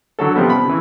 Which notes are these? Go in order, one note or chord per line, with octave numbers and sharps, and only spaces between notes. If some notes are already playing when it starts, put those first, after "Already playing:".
D3 F#3 A4
C3 F3 G3 B3
B5
C#3 E3